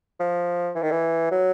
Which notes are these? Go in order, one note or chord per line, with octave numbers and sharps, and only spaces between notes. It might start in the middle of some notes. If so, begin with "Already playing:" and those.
F3
E3
D#3
E3
F#3